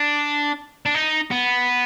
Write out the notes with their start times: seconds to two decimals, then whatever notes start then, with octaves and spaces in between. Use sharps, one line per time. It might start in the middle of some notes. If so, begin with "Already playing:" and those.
Already playing: D4
0.86 D4
0.95 D#4
1.31 B3